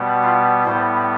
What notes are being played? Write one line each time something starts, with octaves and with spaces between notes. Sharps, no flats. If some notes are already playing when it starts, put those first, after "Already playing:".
Already playing: B2 G3 B3
F4
A2 G3 B3 C5